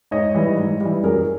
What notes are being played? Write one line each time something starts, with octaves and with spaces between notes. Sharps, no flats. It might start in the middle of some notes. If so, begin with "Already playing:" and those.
G#2 C#5 D#5
E3 G3
G#2
E3 G3
F#2 G#4 A#4